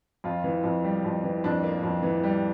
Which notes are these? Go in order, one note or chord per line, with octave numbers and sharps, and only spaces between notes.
F2 F4
E3
F2
G3
F2
E3
F2 D4
A#3
F2
E3
G3